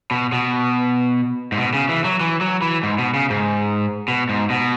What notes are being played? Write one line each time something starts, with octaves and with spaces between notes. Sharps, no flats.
B2
B2
G#2
B2
C#3
E3
F#3
E3
F#3
E3
G#2
B2
C#3
G#2
B2
G#2
B2